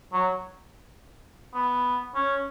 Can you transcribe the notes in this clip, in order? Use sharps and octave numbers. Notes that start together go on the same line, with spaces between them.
F#3
B3
C#4